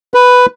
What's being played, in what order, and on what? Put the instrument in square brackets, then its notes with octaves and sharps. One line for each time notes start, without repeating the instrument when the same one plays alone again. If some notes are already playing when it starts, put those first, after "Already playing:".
[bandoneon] B4